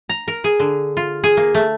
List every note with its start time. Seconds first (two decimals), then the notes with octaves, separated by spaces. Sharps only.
0.09 A#5
0.28 A#4
0.44 G#4
0.60 D3
0.97 F4
1.24 G#4
1.37 A#3
1.55 A3